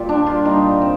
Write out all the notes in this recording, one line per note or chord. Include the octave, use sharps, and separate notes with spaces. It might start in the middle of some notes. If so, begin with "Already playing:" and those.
Already playing: A#2 G3 F4 G4
D4
F4
A#2 G3 D#4
C4